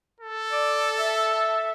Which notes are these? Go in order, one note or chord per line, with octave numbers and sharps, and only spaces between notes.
A4
D5
E5